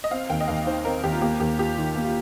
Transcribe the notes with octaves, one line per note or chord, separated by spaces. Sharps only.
D#5
C4 F5
D#2 G5
D#5
D#2 F5
D#3 C5
C4 A#4
D#2 G4
F4
A#3 G4
D#2 G4
F4 G4
D#3
A#3
F4